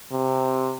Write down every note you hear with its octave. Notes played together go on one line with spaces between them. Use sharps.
C3